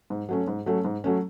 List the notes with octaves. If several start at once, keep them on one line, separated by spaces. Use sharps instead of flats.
G#2
F#3 A3 C#4
G#2
F#3 A3 C#4
G#2
F#3 A3 C#4